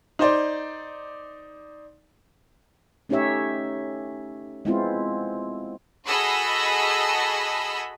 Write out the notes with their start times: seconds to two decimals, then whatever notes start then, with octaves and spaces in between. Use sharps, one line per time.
0.19 D#4 C5 D5
3.09 A3 C#4 D#4 G4 C#5 E5
4.65 G#3 B3 C4 E4 F4
6.06 F#4 G#4 A4 D#5 B5 E6